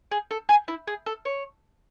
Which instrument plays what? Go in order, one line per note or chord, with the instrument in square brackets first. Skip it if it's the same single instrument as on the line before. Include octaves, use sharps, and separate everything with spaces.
[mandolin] G#4
A4
G#4
E4
G#4
A4
C#5